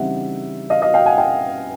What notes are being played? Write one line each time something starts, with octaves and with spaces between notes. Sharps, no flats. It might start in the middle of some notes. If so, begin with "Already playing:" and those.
Already playing: C#3 E3 G3 C4 D#4 E5 F#5
D#5 F5
D#5 F5
F5 G5
F#5 G#5
F5 G5